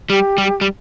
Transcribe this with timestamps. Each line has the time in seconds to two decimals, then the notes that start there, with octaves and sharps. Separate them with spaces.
0.09 G3 G4
0.38 G3
0.61 G3